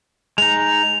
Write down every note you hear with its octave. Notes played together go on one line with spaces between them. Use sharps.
G#3 D#4 F7